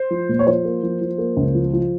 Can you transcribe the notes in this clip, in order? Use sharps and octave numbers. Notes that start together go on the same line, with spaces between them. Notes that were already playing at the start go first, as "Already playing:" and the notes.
Already playing: C5
F3
A#2
C#5
F3 C5
A#3
F3
F3
A#3
C#2
F3
F3